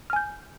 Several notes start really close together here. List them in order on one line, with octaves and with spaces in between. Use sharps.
F6 G#5 G6